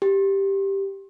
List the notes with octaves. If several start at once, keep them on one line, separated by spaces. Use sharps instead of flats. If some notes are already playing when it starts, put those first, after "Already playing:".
G4